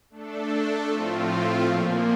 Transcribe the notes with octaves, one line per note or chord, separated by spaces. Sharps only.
A3 D4 A4
A2 F3 A3 C4 F4
A#2 F3 A#3